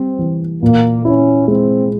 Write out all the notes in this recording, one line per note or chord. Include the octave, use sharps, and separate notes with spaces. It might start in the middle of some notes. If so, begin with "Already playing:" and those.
Already playing: G3 C4
E3
A#2 A#3
C#4 E4
G#3 C4